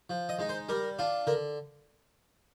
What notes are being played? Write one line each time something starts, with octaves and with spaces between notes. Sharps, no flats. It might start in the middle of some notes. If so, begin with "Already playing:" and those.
F3
D#5
G#3 D#4
C5
G3 A#4
D4 F4
D3 A#4